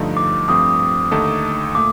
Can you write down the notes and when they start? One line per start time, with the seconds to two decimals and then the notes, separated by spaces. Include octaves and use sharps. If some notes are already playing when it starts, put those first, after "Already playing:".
Already playing: G2 D3 F3 A3 D#4
0.17 D6
0.48 G2 F3 A3 C4 D#6
1.11 D#2 D3 A3 D#4 A4
1.75 A#2 A3 D6